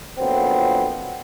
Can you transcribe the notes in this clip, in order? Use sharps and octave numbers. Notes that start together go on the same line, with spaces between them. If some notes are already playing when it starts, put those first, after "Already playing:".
F#2 A#2 D3 F3 B3 C4